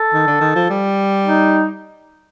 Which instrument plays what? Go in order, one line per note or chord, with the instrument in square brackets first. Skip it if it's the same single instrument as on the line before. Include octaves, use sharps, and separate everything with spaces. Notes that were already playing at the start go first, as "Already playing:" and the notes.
Already playing: [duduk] A4
[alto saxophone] D#3
D3
D#3
F3
G3
[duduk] D#4